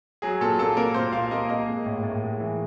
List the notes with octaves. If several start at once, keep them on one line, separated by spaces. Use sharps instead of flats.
F#3 G#4
A#2 A4
A#3 A4
A#3 A#4
A#2 C5
A#2 F5
A#3 D#5
A#3 D#5
G#3
A2
A2
G#3
E3